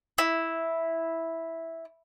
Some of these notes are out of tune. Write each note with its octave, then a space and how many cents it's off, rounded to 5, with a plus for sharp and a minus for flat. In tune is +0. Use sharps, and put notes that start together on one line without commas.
E4 -5